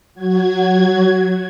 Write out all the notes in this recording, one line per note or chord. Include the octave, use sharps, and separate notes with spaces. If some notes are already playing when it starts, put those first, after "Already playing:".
F#3 F#4 G#6